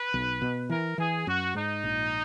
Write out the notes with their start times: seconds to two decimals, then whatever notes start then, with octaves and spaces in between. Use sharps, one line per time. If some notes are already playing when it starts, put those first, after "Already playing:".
Already playing: B4
0.14 B1
0.42 B2
0.70 E3 A#4
0.98 E3 G#4
1.27 F#2 F#4
1.55 G#2 D#4
1.84 A#1